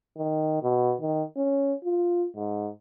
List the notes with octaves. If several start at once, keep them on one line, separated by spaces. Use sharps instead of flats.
D#3
B2
D#3
C#4
F4
G#2